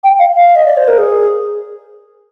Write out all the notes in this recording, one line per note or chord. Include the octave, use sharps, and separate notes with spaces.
G5
F5
F5
D#5
D5
C5
A#4
G#4